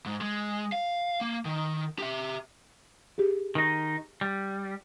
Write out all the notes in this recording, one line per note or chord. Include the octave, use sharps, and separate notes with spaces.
G#2
G#3
F5
A#3
D#3
G4 E5
G4 G#4
D#3 D#4
G3